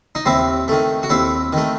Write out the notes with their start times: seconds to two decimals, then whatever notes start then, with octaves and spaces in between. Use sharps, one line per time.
0.15 D#4
0.26 D#2 C4 E4
0.68 D#3 A3
1.03 F#4
1.10 D#2 C4 E4
1.53 D#3 A3